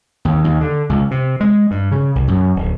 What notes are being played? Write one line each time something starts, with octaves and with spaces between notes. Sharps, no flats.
D#2
D#2
D3
C#2
C3
G#3
G2
C#3
C2
F#2
D1